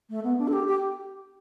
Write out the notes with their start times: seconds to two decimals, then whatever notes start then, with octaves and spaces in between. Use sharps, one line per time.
0.10 A3
0.24 B3
0.38 D4
0.48 A4
0.53 G4
0.67 G4